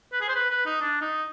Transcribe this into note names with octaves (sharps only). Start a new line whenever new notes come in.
B4
G#4
C5
B4
B4
D#4
D4
D#4